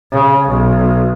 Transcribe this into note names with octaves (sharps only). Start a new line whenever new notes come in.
C#3
B1